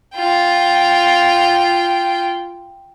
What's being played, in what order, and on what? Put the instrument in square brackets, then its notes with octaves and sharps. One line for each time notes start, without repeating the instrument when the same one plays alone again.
[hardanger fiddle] F4 G5